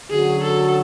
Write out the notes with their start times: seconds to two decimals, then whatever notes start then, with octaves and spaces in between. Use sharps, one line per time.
0.11 D3 F#3 C#4 F#4 G#4
0.43 A4